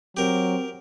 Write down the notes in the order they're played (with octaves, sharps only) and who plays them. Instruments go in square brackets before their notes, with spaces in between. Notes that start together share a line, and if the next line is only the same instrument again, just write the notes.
[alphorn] F#3 [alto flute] C4 [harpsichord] G4 A#4